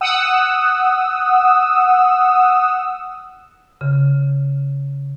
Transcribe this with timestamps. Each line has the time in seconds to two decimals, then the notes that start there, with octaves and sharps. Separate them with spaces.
0.01 F#5 D#6 E6
3.81 C#3